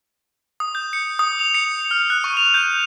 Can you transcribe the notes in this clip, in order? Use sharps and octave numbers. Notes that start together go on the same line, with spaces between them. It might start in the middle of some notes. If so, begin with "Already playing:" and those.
D#6
G6
C#7
D#6
F7
C#7
F6
F#6
C#6
F7
G6